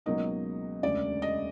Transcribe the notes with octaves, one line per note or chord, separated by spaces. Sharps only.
C#2 B2 F#3 A#3 D#4 D#5
E1 D2 C#3 D5
D#5